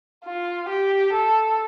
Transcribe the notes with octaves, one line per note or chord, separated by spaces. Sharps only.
F4
G4
A4